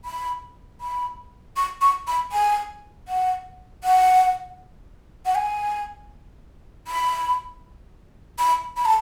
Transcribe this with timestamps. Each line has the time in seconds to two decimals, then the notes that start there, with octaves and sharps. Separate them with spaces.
0.05 B5
0.81 B5
1.56 C#6
1.81 C#6
2.07 B5
2.32 G#5
3.08 F#5
3.84 F#5
5.26 F#5
5.35 G#5
6.87 B5
8.39 B5
8.77 B5
8.85 A5